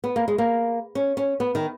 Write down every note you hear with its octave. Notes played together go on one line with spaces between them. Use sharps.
B3
A#3
G#3
A#3
C#4
C#4
B3
D#3